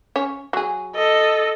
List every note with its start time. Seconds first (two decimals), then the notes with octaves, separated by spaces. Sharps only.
0.16 C#4 C#5
0.53 F#3 G#4
0.96 A4 D#5